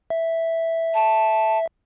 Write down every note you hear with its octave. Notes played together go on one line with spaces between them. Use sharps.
E5
A5